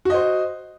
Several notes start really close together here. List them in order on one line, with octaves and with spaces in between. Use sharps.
F#4 D#5 C5